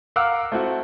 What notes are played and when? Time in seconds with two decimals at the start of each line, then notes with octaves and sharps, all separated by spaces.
0.16 A#4 F5 F#5 D6 E6 F#6
0.52 A3 C4 E4 F#4